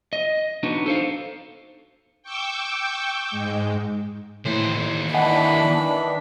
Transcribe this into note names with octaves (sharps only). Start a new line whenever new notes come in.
D#5
B3 D4 D#4 F#4
A4 C5 F5
G5 C#6 D6 E6 G6
G#2 G#3
D#2 A2 E3 C5
D#3 E3 D4 D#5 F#5 B5